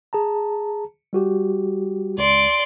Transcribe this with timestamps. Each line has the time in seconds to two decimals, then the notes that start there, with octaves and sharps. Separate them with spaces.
0.13 G#4 A5 A#5
1.13 G3 F#4 G4
2.18 C#2 D5 C6